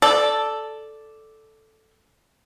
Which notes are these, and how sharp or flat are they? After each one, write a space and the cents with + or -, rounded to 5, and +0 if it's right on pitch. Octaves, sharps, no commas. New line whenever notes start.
A4 +0 D5 +0